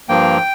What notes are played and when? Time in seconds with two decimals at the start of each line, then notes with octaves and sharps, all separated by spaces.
0.09 G2 F3 A#3 G5